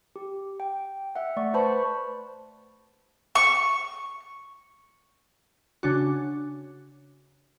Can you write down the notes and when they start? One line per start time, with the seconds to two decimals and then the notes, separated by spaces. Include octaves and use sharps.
0.16 G4
0.60 G5
1.15 E5 F#5
1.36 A3 D5 C#6
1.54 B4 C5 A5 B5 C#6
3.35 C#6
5.83 C#3 D4 F#4